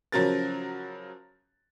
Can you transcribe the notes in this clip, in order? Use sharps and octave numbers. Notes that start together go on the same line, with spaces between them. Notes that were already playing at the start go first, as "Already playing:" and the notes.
C#3 F3 F#3 A#4 A6